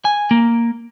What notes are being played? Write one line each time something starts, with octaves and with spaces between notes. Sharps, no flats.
G#5
A#3